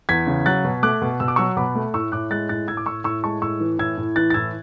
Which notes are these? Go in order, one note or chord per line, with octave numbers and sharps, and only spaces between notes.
E2 G#6 B6
C#3
F#3 F#6 A6
B2
A3 D6 F#6
B2
B2 E6
D6
F#3 C#6 E6
B2 B5 D6
A3
A2 C#6 E6
A2 D6 F#6
G#3 F#6 A6
A2 F#6 A6
A2 E6 G#6
D6
A2 C#6 E6
A2 C#6 E6
G#3 A5 C#6
A2 C#6 E6
E3
A2 E6 G#6
A2
E3 F#6 A6
A6
A2 E6 G#6